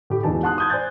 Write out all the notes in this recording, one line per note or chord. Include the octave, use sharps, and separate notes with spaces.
A2 G4
E1 E3 D#4 G#4 A5
F#5 A5 C6 D#6 F#6
D#6 G6 G#6
C5 D5 G#5 G6 A6